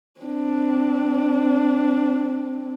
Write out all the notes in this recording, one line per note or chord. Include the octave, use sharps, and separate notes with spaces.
C4 D4